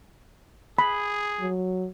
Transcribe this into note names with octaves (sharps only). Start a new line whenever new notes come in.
G#4 B5
F#3